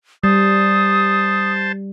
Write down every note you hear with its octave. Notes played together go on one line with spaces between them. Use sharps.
G3 C5 A5 D#6